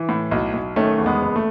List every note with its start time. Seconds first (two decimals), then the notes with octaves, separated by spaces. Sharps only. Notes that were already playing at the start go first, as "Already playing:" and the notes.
Already playing: E3
0.09 A2
0.31 B1
0.53 B1
0.76 D#3 A3 C#4
0.98 E2
1.06 G#3 B3
1.22 F#1
1.36 A3